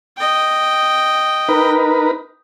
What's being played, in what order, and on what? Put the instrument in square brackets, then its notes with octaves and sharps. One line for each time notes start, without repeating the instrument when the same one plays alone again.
[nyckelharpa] D#5 G5
[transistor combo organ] D#4 A#4 B4